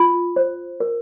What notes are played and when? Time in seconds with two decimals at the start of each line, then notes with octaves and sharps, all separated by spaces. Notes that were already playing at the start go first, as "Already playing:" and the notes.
Already playing: F4
0.36 C5
0.80 A#4